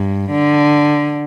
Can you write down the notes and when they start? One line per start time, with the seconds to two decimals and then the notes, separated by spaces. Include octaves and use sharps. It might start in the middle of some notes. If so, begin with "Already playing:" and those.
Already playing: G2
0.31 D3